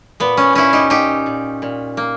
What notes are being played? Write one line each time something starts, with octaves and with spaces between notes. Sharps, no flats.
A#2 B3
C#4
A#2 C#4 E4
D#4 G4
A#2 D#4 G4
A#2
A#2
A#3